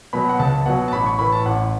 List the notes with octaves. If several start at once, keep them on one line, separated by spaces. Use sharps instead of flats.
B2 F#3 B5
F#5
C#2 A5
A5
B2 F#3 F#5
A5
A1 B5
C#6
A2 E3 B5
A5
A1 F#5